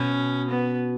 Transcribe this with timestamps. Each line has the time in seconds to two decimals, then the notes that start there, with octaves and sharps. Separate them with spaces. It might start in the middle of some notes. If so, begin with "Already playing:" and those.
Already playing: B2 C#4
0.50 B3